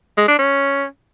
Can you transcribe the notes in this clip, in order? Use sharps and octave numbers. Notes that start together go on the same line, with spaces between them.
G#3
D4
C#4